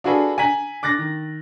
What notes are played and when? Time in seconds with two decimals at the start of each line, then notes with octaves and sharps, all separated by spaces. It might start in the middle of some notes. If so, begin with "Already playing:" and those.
0.04 D4 F4 F#4 G#4 A4 B4
0.38 G#5 A#5 B6 F#7
0.83 D6 F#6 A6 A#6
0.99 D#3